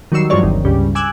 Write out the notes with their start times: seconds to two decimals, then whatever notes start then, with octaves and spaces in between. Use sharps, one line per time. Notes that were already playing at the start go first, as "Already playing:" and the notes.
0.12 D#3 F#3 G3 C#6 E6 C7
0.30 G2 F3 F#3 G#3 C#5 D5
0.43 G1 D#2 C3 D#3
0.65 C#2 G2 C#3 G3
0.95 G#5 D6 E6 F#6 G#6